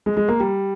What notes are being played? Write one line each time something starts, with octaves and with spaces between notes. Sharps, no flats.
G#3
G#3
A#3
G3